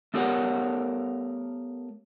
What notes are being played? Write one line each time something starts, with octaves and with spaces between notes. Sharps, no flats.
A3 B3 G4 A#4 C#5 F#5